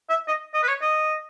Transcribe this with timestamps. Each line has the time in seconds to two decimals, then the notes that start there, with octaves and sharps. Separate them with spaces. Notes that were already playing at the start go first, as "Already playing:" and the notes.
0.09 E5
0.27 D#5
0.54 D#5
0.63 B4
0.68 C#5
0.82 D#5